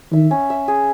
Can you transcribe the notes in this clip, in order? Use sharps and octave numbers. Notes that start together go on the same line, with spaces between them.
D#3 E5
C#4
E5
G#4